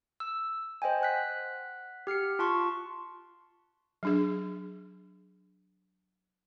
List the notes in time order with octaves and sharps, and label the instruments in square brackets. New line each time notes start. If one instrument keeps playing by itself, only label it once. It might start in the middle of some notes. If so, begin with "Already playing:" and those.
[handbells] E6
C5 D#5 G5 G#5
F#5 F#6 B6
G4 F6 C7 C#7
F4 A5 C6 C#6
[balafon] F#3 D4 G#4